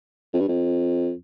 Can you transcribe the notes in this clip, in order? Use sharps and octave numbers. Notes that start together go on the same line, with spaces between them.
F2
G2
F2